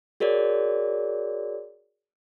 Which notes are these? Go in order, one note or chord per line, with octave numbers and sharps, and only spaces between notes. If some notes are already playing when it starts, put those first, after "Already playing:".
F#4 G#4 A#4 C#5 D5